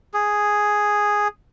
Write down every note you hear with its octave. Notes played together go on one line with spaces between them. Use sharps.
G#4